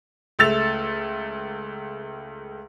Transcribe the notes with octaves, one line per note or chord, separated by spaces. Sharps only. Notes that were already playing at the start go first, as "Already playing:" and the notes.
C#2 A3 E6 A6 F7